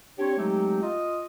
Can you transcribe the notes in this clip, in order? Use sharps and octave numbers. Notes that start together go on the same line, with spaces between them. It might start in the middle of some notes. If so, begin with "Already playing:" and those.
C4 D4 G4 C#5
F#3 G#3 A3 C4 D#4 G4
F4 D#5